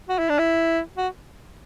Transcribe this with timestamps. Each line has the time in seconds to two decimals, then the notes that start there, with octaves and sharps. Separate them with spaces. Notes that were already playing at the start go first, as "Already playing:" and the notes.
0.09 F#4
0.19 E4
0.29 D4
0.39 E4
0.97 F#4